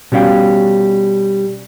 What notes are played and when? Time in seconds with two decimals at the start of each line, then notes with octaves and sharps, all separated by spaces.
0.12 B2 G3 C#4 F5 G5